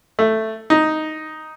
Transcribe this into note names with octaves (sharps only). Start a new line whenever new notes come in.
A3
D#4